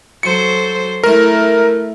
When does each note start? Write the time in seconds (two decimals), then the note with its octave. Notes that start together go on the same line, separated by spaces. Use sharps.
0.23 F#3 A4 C5 C#7
1.04 A3 E4 A#4